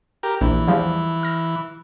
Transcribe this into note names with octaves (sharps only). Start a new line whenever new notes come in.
G4 A#4
A#1 E3
E2 F3 G3
F6 A#6